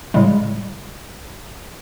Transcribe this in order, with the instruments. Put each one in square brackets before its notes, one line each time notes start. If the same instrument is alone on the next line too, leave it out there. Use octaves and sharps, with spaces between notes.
[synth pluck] A2 C#3 G3 G#3